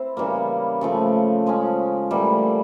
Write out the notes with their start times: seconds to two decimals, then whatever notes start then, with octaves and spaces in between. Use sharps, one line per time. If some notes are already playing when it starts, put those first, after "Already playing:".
Already playing: C4 E4
0.17 C#3 E3 G3 A#3
0.81 C#3 F3 A3
1.46 F3 G#3 C#4
2.11 A2 E3 G3 A#3